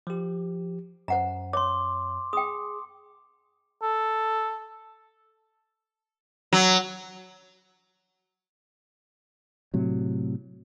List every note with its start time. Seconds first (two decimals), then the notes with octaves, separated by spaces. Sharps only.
0.07 F3 G4
1.08 F#2 C5 F#5 A#5
1.53 C#5 C6 D6
2.33 G#4 G5 D#6
3.83 A4
6.53 F#3
9.74 A2 C3 F#3